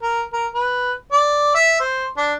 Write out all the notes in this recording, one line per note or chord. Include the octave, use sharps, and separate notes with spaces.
A#4
A#4
B4
D5
E5
C5
D4